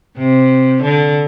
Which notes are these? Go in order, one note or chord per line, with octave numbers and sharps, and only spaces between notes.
C3
D3